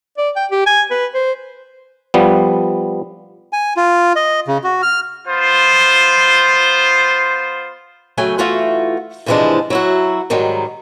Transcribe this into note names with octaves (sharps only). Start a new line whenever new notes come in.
D5
G5
G4
G#5
B4
C5
F3 G3 B3
G#5
F4
D#5
C#3
F#4
F6
B3 F4 C5
C#3 F#3 A3 G5 G#5
E3 A3 F4 F#4
G#2 C3 E3 F3 G#3 D4
F#3 E4 F#4
G#2 D#3 F#3 G3